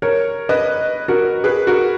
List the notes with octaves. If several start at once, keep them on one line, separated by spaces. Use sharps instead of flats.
A#4 C#5
B4 D#5
F#4 A#4
G#4 B4
F#4 A#4